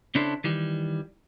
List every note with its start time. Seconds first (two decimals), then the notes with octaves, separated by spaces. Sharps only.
0.15 C#3 C#4 D4 E4 A4 C5
0.44 D#3 E3 G3